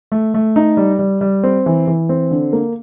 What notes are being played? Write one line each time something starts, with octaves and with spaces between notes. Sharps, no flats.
A3
A3
D#4
G3
G3
G3
C4
E3
E3
C4
D3
A#3